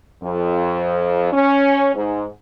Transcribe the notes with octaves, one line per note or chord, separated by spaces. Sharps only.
F2
C#4
G#2